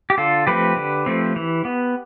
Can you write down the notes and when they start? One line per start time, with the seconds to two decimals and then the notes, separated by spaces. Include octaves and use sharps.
0.10 G4
0.18 D3 F4 A4
0.47 F3 A3 C4 G4 B4
0.77 D3
1.06 F3 A3 C4
1.36 E3
1.65 B3